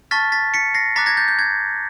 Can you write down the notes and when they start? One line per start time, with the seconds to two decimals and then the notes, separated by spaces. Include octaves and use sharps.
0.11 A5 C#6 F6 A6 B6
0.32 A6 B6
0.54 B6 C#7
0.74 A#6 C7
0.96 A#5 D6 F#6 A6 B6
1.06 G#6 A#6
1.17 G6 A6
1.28 G6
1.39 G#6